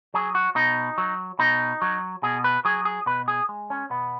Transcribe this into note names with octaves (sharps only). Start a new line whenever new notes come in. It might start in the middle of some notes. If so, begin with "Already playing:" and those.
F#3 G#4
F#4
B2 D#4
F#3
B2 D#4
F#3
B2 G#4
B4
F#3 G#4
G#4
B2 B4
G#4
G#3
C#4
B2 B3